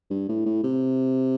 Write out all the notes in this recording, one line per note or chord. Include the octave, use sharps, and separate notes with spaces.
G2
A2
A2
C3